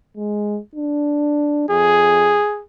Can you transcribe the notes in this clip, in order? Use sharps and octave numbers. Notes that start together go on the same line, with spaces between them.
G#3
D4
F2 G#4